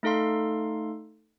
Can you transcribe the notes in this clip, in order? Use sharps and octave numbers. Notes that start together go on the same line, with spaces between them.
A3 D#4 A4 F5 C6